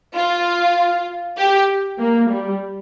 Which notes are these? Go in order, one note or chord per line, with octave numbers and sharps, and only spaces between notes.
F4
G4
A#3
G3